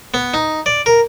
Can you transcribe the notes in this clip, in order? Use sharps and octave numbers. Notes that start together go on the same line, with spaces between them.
B3
D#4
D5
A#4